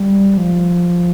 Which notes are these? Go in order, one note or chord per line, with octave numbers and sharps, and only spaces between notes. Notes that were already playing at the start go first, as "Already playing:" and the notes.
Already playing: G3
F3